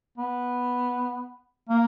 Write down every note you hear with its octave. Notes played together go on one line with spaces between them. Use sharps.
B3
A#3